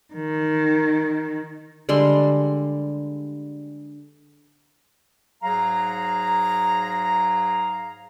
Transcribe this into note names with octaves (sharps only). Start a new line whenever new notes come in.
D#3
D3 G3 G#3 C6
G#2 F#3 G#4 F5 A#5